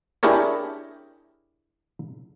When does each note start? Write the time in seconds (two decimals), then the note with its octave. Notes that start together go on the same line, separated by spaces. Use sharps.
0.23 D4 E4 G4 G#4 A#4 C#5